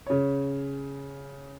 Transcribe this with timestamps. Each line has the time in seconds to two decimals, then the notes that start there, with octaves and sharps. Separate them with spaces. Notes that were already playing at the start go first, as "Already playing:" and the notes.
0.06 C#3 C#5